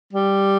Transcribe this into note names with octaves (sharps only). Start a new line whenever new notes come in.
G3